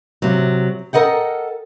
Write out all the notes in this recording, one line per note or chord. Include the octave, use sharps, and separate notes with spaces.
C3 F#3
A4 A#4 D#5 F#5 G5